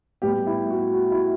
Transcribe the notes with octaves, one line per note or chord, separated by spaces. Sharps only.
A2 G3 B3 G4
E4
F#4
F#4
E4